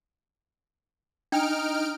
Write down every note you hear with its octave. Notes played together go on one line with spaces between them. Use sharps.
D4 D#4 G5 F6 D7